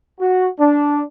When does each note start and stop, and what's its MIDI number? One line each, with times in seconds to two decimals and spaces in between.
0.19 0.47 66
0.59 1.00 62